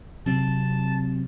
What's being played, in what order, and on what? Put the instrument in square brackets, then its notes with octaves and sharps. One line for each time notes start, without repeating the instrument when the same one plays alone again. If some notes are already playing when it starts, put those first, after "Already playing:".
[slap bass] C3 F#3 C4 [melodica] A5